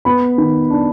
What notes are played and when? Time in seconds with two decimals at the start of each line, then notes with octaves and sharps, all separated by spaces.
0.05 B3 B5
0.38 D#3
0.70 D4